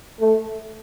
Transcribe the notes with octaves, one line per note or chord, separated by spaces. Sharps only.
A3